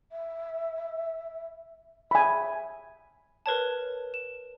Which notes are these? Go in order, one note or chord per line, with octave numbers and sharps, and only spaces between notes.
E5
E5 G#5 B5
A#4 B4 C#5 A5
E7